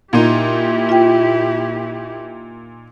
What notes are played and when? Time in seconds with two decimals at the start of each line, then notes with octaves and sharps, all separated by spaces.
0.13 A#2 D#4 E4 G4
0.89 F4 G5